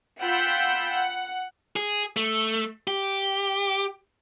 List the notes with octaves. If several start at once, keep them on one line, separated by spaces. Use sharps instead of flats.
F4 F#5 G5 B5 E6 G6
F#5
G#4
A3
G4